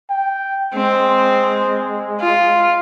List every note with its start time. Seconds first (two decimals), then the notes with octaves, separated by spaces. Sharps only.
0.10 G5
0.74 G#3 C4
2.20 F4